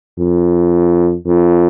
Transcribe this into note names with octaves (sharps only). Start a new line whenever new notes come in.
F2
F2